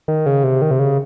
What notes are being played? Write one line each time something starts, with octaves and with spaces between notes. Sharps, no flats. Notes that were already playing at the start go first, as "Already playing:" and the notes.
D#3
C#3
C3
D#3
C3
C#3